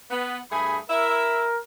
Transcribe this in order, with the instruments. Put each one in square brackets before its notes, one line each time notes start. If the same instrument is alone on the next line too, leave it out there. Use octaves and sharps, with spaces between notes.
[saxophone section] B3
[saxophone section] G2 A3 G#4 [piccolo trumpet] B5
[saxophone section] E4 E5 [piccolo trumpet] A#4